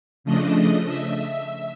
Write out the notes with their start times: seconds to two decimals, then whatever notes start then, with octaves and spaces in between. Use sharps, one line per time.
0.24 C#3 F3 A3 D4 D#5
0.87 E5